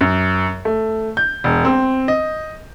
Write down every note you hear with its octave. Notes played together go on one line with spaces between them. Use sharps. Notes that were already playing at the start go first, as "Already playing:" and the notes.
F#2
A3
G6
E1
C4
D#5